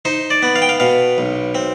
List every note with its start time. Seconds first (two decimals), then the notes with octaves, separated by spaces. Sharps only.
0.05 D#4 C5
0.30 D5
0.42 B3
0.56 F5
0.62 G5
0.69 F5
0.80 B2 F5
1.18 B1
1.55 C4